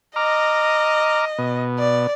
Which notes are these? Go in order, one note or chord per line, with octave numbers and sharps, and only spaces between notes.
D#5 A#5 D6 F6
B2
D5